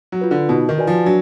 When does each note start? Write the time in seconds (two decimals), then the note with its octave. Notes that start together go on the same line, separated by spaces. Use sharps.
0.12 F#3
0.21 F4 B4
0.31 D3
0.49 B2 D#4
0.69 D#3
0.78 F#4 B4 D5 G#5
0.87 F3
1.06 F#3 D4